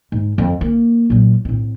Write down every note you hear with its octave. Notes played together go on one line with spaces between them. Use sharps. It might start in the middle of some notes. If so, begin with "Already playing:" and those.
G#2
F2
A#3
A#2 F#3
A2 C4